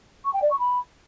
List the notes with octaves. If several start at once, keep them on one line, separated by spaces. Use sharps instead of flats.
C#6
G5
D5
C#6
B5